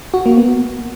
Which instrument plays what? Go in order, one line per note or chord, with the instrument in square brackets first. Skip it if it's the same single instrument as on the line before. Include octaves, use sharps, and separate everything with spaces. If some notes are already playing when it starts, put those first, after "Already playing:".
[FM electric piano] F#4
A#3
B3